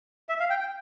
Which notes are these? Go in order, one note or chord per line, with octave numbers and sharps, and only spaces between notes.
E5
F5
G5
G5